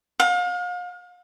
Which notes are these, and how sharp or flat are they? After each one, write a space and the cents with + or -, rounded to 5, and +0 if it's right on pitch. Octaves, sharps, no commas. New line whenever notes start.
F5 +40